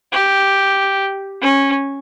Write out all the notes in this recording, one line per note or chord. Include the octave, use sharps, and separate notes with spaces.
G4
C#4